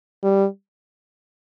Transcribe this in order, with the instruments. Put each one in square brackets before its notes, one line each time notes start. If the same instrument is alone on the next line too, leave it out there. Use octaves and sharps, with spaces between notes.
[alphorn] G3